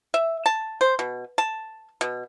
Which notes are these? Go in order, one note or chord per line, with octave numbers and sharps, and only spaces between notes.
E5
A5
C5
B2
A5
B2